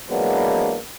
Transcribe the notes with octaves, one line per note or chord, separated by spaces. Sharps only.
E3 F#3 G#3 A#3 B3 D4